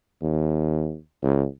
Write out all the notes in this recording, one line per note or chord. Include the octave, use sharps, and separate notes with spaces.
D#2
C#2